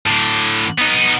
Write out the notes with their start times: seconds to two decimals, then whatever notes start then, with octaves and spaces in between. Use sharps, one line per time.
0.06 A2 D3
0.78 B3 D#4